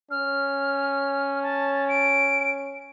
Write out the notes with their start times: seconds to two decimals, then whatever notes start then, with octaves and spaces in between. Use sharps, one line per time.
0.11 C#4 F6
1.43 A5
1.89 D7